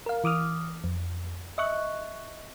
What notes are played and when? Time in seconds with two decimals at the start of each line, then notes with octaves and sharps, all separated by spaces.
0.06 A#4 F5
0.24 E3 D6 D#6 F6
0.84 F2
1.58 D#5 E5 C#6 F#6